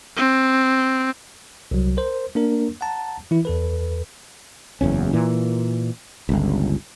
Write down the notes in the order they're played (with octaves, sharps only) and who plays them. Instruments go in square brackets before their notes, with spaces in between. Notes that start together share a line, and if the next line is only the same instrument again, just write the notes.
[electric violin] C4
[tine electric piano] C2 F#3
A#4 C5
A#3 D4 A#4
F#5 A5 A#5
E3 E4
E2 A4 B4
[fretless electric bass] F#1 E2 C#4
A#2 E3
G1 C#2